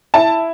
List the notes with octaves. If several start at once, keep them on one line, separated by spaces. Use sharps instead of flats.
E4 A5